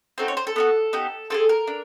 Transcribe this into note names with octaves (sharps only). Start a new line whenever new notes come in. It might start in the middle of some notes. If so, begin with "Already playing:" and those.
C4 D#4 F#4 A4 C5
C#5
C5
A4
B3 D#4 F#4
B3 D#4 G4
C4 F4 G#4 A4
A#4
D4